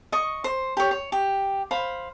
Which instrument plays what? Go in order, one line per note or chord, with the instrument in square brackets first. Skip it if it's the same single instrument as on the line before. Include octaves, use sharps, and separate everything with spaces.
[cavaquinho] D#5 C#6
C5
G4 C#5
C#5
G4
C5 F5 B5